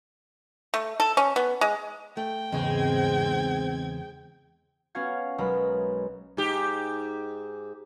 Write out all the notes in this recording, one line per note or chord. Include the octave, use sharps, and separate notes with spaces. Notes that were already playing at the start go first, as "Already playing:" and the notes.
A3
A4
C#4
B3
G#3
A3 G5
E2 G#2 C#3 G#3 C4 G#6
B3 C#4 F#4 F5 G#6
B1 G#3 A#4 B4 B5
G#2 G4